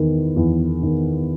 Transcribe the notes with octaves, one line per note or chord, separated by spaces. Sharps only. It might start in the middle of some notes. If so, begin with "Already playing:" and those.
Already playing: E2 D#3
E2
D#3